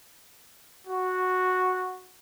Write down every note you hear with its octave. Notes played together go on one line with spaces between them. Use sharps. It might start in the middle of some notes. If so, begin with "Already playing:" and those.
F#4